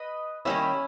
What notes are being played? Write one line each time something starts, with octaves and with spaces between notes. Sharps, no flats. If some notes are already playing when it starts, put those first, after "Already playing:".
Already playing: B4 D#5
D#3 G3 A#3 C#4 E4